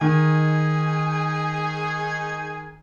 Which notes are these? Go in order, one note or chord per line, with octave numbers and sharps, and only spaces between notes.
D#3 D#4 G#4 G#5